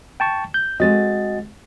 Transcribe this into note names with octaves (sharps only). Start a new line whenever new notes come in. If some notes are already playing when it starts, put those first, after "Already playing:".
G5 A5 C#6
G6
G#3 C4 F#4 D#5 A6